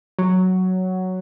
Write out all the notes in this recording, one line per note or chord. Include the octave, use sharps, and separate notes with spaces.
F#3